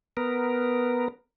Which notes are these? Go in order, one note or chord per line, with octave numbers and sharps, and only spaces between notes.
B3 A#4